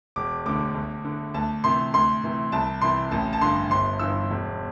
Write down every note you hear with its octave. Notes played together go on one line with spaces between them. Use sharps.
E1 D6
D2 D3 D6
D2
D3
D2 A5
C3 E3 C6
D2 C6
C3 E3
C2 A5
C3 E3 C6
A1 A5
A5
G2 D3 C6
G1 C6
G2 E3 E6
E1